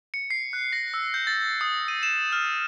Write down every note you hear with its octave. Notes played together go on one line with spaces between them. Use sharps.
C#7
C7
F#6
A#6
E6
G6
A6
D#6
D#7
E7
F6